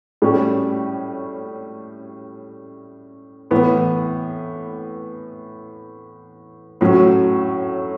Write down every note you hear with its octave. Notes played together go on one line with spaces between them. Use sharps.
A2 G3 C#4
A2 E3 B3
A2 F#3 C#4